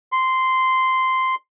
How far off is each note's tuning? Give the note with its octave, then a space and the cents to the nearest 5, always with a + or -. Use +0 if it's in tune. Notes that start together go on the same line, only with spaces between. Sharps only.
C6 -10